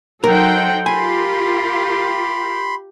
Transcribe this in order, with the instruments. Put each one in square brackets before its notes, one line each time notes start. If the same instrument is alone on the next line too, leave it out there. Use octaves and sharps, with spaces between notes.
[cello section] F#3 D#4 C5 [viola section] A4 F#5 G5 [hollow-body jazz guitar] A#4 A#5
[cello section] F4 A#4 [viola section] G4 [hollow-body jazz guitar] G#5 [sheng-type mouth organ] B5 C6